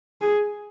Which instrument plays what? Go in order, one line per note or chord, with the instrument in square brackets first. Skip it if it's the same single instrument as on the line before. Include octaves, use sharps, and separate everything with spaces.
[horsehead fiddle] G#4